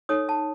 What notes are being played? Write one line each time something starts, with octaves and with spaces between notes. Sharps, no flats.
D#4 A4 C#5 D#6
A5